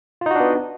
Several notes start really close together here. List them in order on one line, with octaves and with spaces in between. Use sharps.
F4 D#4 F#4 D4 B3